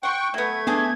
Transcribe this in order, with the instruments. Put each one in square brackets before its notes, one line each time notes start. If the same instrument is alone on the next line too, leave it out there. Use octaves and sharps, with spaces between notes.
[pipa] F#5 C6 [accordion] G5 C#6 [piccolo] F#6
[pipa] F#3 B3 [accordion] A3 [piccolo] G#6
[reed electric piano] B3 [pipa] D4 G#4 A4